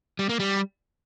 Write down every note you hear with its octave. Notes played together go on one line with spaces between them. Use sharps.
G3
A#3
G3